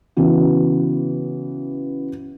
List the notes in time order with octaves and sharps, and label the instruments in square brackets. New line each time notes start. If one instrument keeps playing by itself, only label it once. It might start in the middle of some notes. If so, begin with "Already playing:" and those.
[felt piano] C#3 E3 B3 F#4